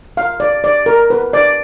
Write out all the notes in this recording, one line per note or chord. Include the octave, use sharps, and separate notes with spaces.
F5
D5
D5
A#4
B4
D5